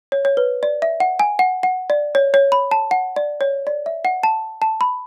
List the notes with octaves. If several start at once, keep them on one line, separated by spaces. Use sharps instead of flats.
C#5
C#5
B4
D5
E5
F#5
G#5
F#5
F#5
D5
C#5
C#5
B5
A5
F#5
D5
C#5
D5
E5
F#5
A5
A5
B5